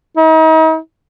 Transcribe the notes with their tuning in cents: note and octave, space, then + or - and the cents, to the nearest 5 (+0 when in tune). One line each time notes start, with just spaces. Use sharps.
D#4 +40